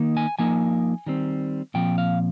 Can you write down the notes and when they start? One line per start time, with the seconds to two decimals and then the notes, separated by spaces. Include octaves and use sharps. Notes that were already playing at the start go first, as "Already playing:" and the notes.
Already playing: D#3 A#3 D#4
0.17 G#5
0.39 F3 A#3 D#4 G#5
1.06 D#3 G3 C4
1.74 A#2 F3 C4 G5
1.98 F5